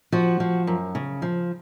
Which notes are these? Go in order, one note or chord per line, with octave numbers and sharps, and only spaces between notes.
F3 F#4
F3
F#2
C#3
F3